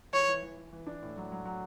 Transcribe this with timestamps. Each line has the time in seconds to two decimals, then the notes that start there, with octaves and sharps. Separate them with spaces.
0.13 E3 C#5
0.28 E3
0.42 E3
0.57 E3
0.72 E3
0.87 D4
1.02 A2
1.17 F#3
1.32 F#3
1.45 F#3